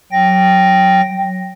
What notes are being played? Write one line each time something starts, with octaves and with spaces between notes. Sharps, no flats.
F#3 G5 A#6